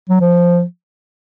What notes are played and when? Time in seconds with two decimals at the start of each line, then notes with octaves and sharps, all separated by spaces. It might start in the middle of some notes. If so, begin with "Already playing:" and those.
0.09 F#3
0.21 F3